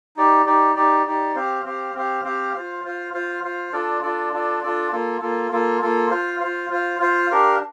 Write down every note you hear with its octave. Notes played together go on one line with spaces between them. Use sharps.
D#4 G4 D5
D#4 G4 D5
D#4 G4 D5
D#4 G4 D5
C4 G4 C5 F5
C4 G4 C5 F5
C4 G4 C5 F5
C4 G4 C5 F5
F4 C5 F5
F4 C5 F5
F4 C5 F5
F4 C5 F5
D4 F4 A4 D5
D4 F4 A4 D5
D4 F4 A4 D5
D4 F4 A4 D5
A#3 F4 A4
A#3 F4 A4
A#3 F4 A4
A#3 F4 A4
F4 C5 F5
F4 C5 F5
F4 C5 F5
F4 C5 F5
D4 G4 A#4 F5